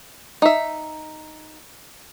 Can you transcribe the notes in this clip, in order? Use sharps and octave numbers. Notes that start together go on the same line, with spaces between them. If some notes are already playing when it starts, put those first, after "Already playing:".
D#4 E5